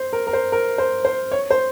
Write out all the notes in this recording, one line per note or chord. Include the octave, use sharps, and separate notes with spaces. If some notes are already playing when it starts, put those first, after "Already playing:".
Already playing: C5
A#4
A#4
C5
A#4
C5
C5
C#5
C5